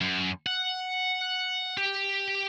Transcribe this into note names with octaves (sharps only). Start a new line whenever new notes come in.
F#2
F#5
G4